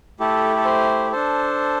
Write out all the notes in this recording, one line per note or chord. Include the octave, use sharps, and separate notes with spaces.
A3 E4 G4 A4
A4
C5
D4 A4 C5